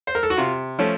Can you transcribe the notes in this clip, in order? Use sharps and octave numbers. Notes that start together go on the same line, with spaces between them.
C5
A#4
A4
F#4
C3 F4
F3 A3 C#4